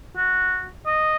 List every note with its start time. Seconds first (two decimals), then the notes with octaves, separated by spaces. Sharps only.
0.17 F#4
0.86 D#5